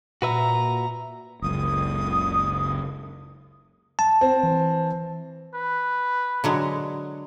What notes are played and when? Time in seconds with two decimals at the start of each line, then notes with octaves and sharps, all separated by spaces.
0.22 A#2 F#4 B4 E5 A#5
1.42 F#1 C#2 D#6
3.99 A5
4.21 C4
4.43 E3
5.54 B4
6.44 D3 F#3 G#3